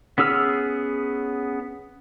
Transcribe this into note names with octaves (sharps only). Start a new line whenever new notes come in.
B3 C#4 G#4 E6 F6